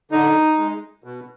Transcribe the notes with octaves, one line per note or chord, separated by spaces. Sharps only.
D3 D#4
G#3
B2